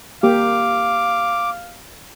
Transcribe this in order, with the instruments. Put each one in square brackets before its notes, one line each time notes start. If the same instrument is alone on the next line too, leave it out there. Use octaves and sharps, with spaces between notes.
[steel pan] A#3 G4 [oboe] F5 [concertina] D6